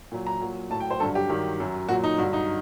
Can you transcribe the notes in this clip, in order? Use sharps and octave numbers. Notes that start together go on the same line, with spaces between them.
A#2 F#3
A#5
A#2 F#3
A2 F#3 A5
G5
C5
G2 D3 F#3 A4
G4
G2 D#3 F#3 G4
F#2 F#3
A#2 F#3 F#4
D#4
G2 D3 F#3 F#4
D#4